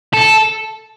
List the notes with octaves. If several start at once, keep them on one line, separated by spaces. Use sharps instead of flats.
A4